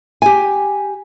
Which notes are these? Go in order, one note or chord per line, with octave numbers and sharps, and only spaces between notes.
G4 G#5